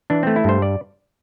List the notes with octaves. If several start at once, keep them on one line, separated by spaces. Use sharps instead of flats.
E3 D4
A3 C4
E4
G2 C5
D5